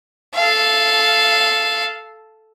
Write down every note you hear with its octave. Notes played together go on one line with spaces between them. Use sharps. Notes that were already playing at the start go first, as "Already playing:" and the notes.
A4 F5